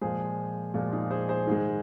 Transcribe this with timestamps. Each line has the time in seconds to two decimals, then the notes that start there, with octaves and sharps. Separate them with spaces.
0.01 A#2 F3 G#3 G#4 C5
0.74 A#2 F3 G#3 F4
0.93 D#4 G#4
1.11 G#4 C5
1.29 G#4 C5
1.47 G#2 D#3 G#3